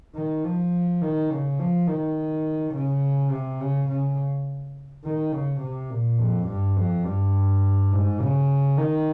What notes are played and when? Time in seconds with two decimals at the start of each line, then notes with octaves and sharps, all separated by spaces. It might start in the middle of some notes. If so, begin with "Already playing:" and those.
0.15 D#3
0.45 F3
1.02 D#3
1.31 C#3
1.59 F3
1.88 D#3
2.74 C#3
3.31 C3
3.60 C#3
3.88 C#3
5.04 D#3
5.32 C#3
5.61 C3
5.90 A#2
6.18 F2
6.48 G2
6.77 F2
7.04 G2
7.92 G#2
8.20 C#3
8.78 D#3